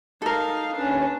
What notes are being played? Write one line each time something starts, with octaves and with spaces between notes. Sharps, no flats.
D#4 A4 A#4 F5
D#2 C#4 D4 B4